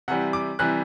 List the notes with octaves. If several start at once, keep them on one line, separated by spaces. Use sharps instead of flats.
C3 E3 G3 F#5
D6
C3 E3 G3 F#6